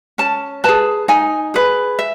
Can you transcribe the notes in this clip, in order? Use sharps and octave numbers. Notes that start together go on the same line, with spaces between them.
C#4 A5
G#4 B4 A5
D#4 G#5
G#4 B4
E5